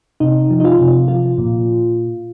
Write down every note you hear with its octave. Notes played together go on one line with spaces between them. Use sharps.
C3 D#4
F3
D#4
F4
C3
F3 F4
A#2